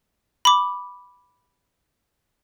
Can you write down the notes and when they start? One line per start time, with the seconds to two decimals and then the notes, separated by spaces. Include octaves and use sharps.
0.45 B5 D6